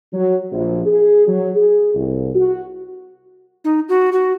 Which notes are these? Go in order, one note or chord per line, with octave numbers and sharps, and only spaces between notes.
F#3
A#1
G#4
F#3
G#4
C2
F#4
D#4
F#4
F#4